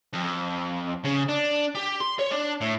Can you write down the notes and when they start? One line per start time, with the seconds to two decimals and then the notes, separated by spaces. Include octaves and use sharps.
0.13 F2
1.05 C#3
1.29 D4
1.75 G4
2.00 C6
2.19 C#5
2.31 D4
2.61 A2